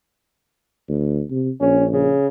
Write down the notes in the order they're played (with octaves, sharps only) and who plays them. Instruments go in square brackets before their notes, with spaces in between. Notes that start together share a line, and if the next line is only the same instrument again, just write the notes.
[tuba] D2
C3
[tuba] A#1 [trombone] C#4
[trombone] C#3